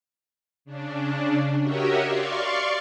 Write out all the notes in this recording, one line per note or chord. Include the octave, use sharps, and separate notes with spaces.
C#3 D4
F#4 G4 A#4 C#5 D#5 E5
D5 F5 C6 C#6